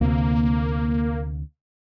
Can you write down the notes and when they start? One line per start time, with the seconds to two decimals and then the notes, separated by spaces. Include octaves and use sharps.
0.01 D2 C3 A#3